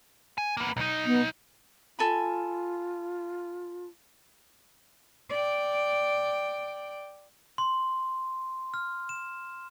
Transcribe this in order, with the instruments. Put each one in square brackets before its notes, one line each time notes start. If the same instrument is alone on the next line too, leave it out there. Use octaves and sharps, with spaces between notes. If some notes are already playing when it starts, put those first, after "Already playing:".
[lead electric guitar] G#5
A#3 B3
B1 D#4
[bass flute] B3
[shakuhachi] F4 [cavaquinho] A4 G#5 B5
[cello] D5 G5
[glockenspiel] C6
F6
E7